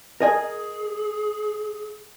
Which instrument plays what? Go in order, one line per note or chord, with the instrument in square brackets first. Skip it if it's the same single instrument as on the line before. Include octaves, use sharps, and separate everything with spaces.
[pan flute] G#4 [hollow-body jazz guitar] A#4 D#5 G#5